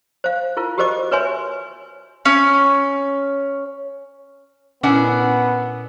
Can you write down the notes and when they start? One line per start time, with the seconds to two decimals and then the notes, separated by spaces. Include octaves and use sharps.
0.24 C5 F5
0.57 E4 F4 A#4
0.78 F#4 G4 A#4 C5 D#5 D6
1.11 A#4 B4 C#5 E5 G#5 C6
2.25 C#4
4.83 A#2 B3 C#4 D4 E4 F#5